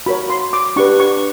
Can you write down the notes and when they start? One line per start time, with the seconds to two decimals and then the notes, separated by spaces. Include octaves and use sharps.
0.06 F#4 A#4 C#5 B5
0.30 C6
0.53 D6
0.76 D4 G4 B4 C#6
1.00 C#6